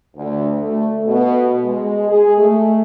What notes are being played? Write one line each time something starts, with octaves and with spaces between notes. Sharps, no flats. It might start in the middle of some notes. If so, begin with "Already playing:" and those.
D2
A3
B2
G#3
G#4
A3